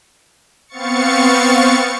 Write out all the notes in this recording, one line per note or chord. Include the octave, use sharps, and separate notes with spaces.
B3 C4 F5 C#6 A6 C#7